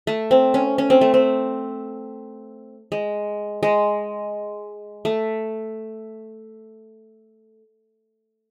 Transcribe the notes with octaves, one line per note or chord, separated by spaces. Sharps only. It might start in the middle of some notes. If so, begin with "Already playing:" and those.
A3
C4
C#4
C#4
C4
A3
C4
G#3
G#3
A3